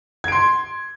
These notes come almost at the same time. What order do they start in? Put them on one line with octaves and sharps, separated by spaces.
G#6 D7 C6